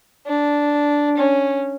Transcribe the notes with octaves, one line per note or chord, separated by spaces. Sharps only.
D4
C#4